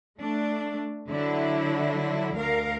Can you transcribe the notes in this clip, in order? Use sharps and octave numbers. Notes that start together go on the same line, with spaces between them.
A3 D4
D3 F#3 E4
D2 A#4 F5